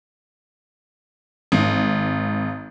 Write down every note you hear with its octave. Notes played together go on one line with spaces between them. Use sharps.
G#1